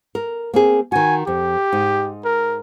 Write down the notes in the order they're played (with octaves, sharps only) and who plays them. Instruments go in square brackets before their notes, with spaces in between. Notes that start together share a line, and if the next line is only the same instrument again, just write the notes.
[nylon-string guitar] A#4
A#3 C4 G#4
[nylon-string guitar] D#3 F#4 [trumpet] G#5
[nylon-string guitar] F2 [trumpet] G4
[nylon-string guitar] G#2 D#4
[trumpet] A#4